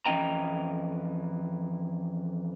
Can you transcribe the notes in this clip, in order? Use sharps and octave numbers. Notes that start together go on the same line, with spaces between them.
F2 E3 C#4 D#5 G5 A#5